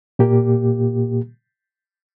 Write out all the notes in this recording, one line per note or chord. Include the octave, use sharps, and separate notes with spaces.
A#2 A#3 G4